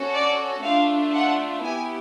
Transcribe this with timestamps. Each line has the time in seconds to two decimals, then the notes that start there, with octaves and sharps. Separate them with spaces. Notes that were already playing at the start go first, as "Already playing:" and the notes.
Already playing: C#4 F#4 A4
0.13 D5
0.63 A3 D4 F4 F5
1.14 F#5
1.63 B3 E4 G4 G#5